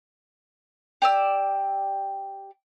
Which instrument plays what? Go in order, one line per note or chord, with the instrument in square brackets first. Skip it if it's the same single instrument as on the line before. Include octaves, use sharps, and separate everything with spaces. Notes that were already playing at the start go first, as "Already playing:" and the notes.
[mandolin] G4 D5 E6